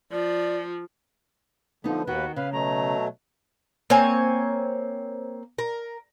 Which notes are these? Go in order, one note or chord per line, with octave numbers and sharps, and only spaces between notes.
F3 D5
D3 F3 B3 D#4
D#2 D#3 F#4 B4
C#3 B4 F5
B2 F#3 A3 A#5
A#3 C4 C#5 G#5
A#4